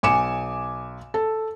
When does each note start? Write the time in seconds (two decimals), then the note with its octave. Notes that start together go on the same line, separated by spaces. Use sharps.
0.03 B1 G#5 D6 C#7 E7
1.14 A4